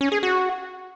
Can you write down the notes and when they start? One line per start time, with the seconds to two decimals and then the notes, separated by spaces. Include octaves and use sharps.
0.01 C#4
0.12 G#4
0.23 F#4